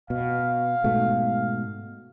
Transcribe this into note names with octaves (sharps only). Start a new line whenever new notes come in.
B2 F5
G#2 B2 A3